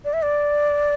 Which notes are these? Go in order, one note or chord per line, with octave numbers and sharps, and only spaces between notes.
D5
E5
D5